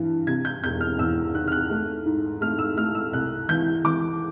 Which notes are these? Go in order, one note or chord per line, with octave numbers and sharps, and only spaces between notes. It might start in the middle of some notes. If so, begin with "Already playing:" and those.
Already playing: G2 E3
C3 G#6
G6
E1 G6
F6
E2 E6
D#3 F#6
F6
F#6
A3
G#2
A3 F6
E6
A3 F6
E6
C2 F#6
E3 G6
E3 D6